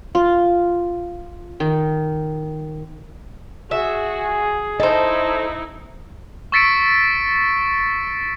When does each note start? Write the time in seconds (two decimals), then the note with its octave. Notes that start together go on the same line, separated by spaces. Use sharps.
0.15 F4
1.60 D#3
3.71 F#4 G#4 E5
4.80 D#4 E4 A4 C5 D#5
6.52 C#6 E6 A6 B6 C#7 D7